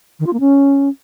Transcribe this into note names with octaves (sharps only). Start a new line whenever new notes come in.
D#3
F4
A#3
C#4